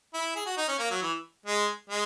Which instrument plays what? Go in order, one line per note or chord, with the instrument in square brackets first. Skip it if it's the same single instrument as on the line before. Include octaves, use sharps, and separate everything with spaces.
[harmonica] E4
G#4
F#4
D#4
C#4
A#3
F#3
E3
G#3
G#3